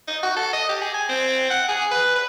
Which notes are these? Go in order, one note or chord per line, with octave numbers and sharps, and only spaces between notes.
D#4
F#4
A4
D#5
G4
G#4
G#5
C4
F#5
G#4
B4
B4